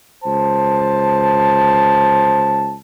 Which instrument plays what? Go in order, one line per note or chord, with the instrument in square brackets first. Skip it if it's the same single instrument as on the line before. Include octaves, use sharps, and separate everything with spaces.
[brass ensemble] C#2 C5 A5